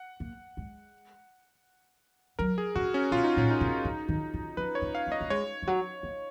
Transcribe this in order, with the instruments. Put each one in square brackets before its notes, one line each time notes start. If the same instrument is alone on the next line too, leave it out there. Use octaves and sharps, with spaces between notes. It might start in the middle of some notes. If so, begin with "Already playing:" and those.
Already playing: [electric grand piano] F#5
[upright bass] A#3
G#3
[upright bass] F#3 [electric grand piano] A#4
[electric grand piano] G#4
[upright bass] C#3 [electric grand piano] F#4
[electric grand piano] C#4
[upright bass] B2 [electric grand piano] F4
[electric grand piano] D#4
[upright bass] A#2 [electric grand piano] C#4
[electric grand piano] D#4
[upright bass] B2
C#3
D#3
D#3
[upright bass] F3 [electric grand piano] B4
[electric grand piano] C#5
[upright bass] A#3
[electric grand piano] F5
[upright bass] A#3
[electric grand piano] D#5
[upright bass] A#3
[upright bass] G#3 [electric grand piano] C#5
[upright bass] F3
F#3
A#3